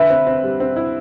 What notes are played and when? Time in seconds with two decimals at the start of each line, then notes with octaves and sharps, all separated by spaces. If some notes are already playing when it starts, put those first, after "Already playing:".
Already playing: D3 B4 E5
0.10 C4
0.27 C4
0.44 G3
0.60 C4
0.76 E4